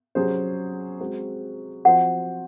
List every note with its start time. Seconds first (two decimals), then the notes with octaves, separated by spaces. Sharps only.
0.15 C3 F#3 C#4 G#4 C5
1.00 G#3 C4 F#4
1.85 F3 C4 F#4 C5 F#5